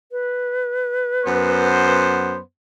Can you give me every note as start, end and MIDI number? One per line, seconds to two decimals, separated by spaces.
0.12 1.94 71
1.25 2.40 42
1.25 2.40 59
1.25 2.40 72